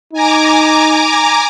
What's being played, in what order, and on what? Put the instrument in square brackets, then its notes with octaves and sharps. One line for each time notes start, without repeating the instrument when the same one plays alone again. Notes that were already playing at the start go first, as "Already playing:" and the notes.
[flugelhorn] D#4 [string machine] G#5 A#5 D6